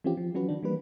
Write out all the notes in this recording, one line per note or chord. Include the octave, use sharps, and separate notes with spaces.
E3 F3 C4 C#4 F4 G4
F3
E3 F#3 C#4 F#4 B4
D#3 D4
E3 G3 A#3 B4